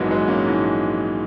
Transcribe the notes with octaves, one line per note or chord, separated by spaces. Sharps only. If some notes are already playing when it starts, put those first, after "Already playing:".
Already playing: A#1 G#2 E3 F#3 G#3 A#3 B3
G#3 B3
A#3 C#4
A#1 G#2 E3